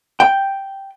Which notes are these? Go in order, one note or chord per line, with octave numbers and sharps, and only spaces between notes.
G5